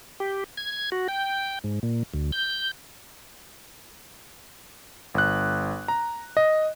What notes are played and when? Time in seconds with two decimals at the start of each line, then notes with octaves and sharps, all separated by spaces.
0.20 G4
0.57 G#6
0.92 F#4
1.08 G5
1.64 G#2
1.83 A#2
2.14 D2
2.32 G6
5.14 G1 F#6
5.88 A#5
6.37 D#5